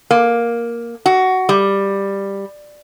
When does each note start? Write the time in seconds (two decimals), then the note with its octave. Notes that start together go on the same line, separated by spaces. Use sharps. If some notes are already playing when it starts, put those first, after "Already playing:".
0.11 A#3
1.06 F#4
1.49 G3